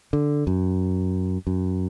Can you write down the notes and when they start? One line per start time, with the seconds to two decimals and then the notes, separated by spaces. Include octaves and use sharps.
0.13 D3
0.47 F#2
1.47 F#2